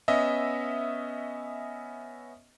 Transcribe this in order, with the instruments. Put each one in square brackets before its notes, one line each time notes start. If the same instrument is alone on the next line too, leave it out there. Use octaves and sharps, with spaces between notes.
[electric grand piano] B3 C#4 D#5 E5